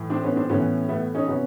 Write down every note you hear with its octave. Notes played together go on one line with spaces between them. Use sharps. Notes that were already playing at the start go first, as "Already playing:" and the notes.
Already playing: A2 E3
C4 D4
B3 C#4
C4 D4
A2 E3 B3 C#4
A3 B3
C#4 D#4
C3 B3 C#4